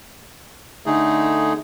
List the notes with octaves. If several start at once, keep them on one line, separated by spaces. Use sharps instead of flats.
D3 A3 D#4 G#4